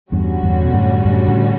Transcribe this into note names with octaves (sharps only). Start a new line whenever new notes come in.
E2 G2 D3 G3 C#4 F#4
E2 G2
B2
F#2 A2
F#2 A2
A2 C#3